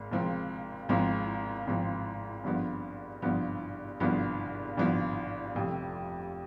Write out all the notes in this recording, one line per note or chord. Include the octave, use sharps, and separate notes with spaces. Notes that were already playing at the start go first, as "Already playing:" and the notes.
Already playing: G#1 G#2
G#1 G#2 F3 C4
G#1 G#2 F3 C4
G#1 G#2 F3 C4
G#1 G2 F3 B3
G#1 G2 F3 B3
G#1 G2 F3 B3
G#1 G2 F3 B3
F1 F2 C3